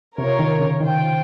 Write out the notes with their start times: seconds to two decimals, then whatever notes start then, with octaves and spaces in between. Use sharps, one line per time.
0.18 C3 F4 A#4 C#5
0.39 D#3
0.60 C#3
0.80 D#3 F4 C5 G5